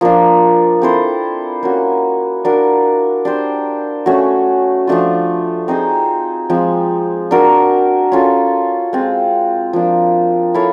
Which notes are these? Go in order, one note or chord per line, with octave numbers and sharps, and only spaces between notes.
F3 A#3 D4
C4 E4 A4 C5
A#3 C#4 F#4
D4 F#4 A#4
D4 G4 C5
A3 C#4 F#4
F3 A3 D4 F4
C4 D#4 G#4 C5
F3 G#3 C4
D4 F#4 A#4
C#4 F4 A4
G#3 C4 F4
F3 A#3 D4
E4 A4 C#5 F5